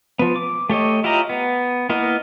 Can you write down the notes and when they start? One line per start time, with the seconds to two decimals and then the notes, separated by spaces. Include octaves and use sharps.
0.19 F3 B3
0.36 D6
0.70 A3 G4 C#5 D#5
1.04 E4 F4 G4 D#5 A#5
1.30 B3
1.89 A#3 B3 E4 A#4 D#5